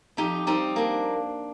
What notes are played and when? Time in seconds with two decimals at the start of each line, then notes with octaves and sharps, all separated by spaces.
0.17 F2 D#4 G4
0.47 G3 C4 D#4
0.76 A#3 D4